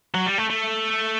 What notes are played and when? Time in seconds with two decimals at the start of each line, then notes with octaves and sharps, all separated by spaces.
0.14 F#3
0.26 G3
0.38 A3
0.49 A3